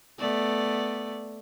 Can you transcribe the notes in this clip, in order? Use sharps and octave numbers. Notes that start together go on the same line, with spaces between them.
A3 B3 D5